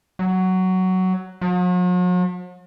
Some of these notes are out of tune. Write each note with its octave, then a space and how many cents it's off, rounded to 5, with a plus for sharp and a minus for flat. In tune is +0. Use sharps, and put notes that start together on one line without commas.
F#3 +10
F#3 -45